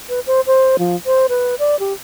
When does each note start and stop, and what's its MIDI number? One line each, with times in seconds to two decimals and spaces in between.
0.09 0.20 71
0.27 0.41 72
0.47 0.77 72
0.79 0.96 53
1.06 1.27 72
1.29 1.55 71
1.59 1.78 74
1.80 1.93 67